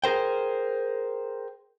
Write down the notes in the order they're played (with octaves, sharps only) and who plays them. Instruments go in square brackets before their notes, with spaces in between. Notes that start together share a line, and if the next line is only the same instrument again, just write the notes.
[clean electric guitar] G#4 A#4 C5 G5